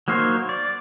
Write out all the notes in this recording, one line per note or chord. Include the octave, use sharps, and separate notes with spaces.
F#3 A#3 D#4 C5 C#5
D5